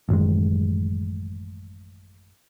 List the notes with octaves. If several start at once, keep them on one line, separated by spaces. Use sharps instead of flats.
A1 F#2 D#3 G#3